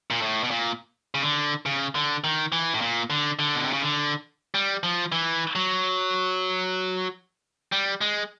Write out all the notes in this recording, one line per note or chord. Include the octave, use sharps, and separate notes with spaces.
A#2
A2
B2
A#2
C#3
D3
C#3
D3
D#3
E3
A2
A#2
D3
D3
B2
C3
C#3
D3
G3
F3
E3
F#3
G3
G#3